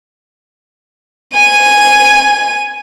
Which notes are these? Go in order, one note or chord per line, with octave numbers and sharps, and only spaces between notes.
G#5 D#7